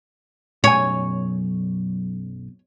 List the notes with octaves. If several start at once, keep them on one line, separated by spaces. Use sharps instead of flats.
B1 F#2 C#5 G#5